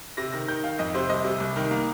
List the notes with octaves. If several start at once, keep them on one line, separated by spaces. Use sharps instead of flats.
C3 A#6
D#3 A#6
D#3 G6
D#3 F5
F2 D#5
C3 C5
C2 D#5
C3
C2
D#3
A#3